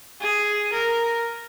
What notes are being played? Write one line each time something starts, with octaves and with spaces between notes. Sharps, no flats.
G#4
A#4